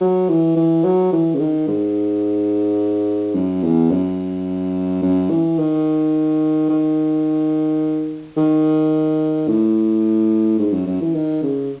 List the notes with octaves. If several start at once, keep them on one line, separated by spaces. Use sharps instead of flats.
F#3
E3
E3
F#3
E3
C#3
D#3
G#2
F#2
E2
F#2
F#2
E3
D#3
D#3
D#3
A2
G#2
F#2
F#2
E3
D#3
C#3